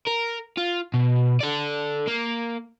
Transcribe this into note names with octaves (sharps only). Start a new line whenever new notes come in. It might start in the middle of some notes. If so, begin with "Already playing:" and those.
A#4
F4
B2
A4 D5
A#3